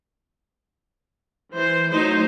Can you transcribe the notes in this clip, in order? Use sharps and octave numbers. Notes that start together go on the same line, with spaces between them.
E3 C5
F#3 A3 D#4 C5